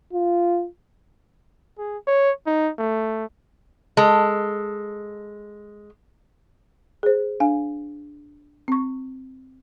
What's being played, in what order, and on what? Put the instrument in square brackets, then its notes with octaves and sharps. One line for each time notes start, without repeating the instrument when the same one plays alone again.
[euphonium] F4
[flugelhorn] G#4
C#5
D#4
A3
[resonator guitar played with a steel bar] G#3 A4
[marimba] G#4 C5
D4 F5 G#5
C4 C#6